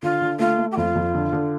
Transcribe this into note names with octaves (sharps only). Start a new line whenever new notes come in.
D3 F4
D3
A3 F4
A3
G4
F2 F4
F2
D3
D3